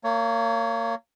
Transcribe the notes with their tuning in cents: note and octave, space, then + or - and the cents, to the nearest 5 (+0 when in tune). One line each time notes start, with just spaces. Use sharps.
A#3 -25 C#5 +15